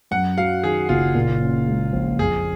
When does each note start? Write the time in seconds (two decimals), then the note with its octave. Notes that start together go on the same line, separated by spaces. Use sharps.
0.11 F#2 F#5
0.37 F#3 F5
0.63 D#3 G#4
0.89 F#1 F4
1.15 A#2
1.42 C#4
1.67 G#3
1.92 A#1
2.19 F2 G#4